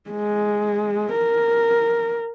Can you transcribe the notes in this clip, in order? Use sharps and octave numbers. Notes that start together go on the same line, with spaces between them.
G#3
A#4